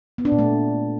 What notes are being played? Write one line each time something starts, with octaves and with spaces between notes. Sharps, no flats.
B3
D4
A#2
A3